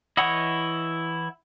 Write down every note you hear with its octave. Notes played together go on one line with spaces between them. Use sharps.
E3 E4 C#5 D#5 F#5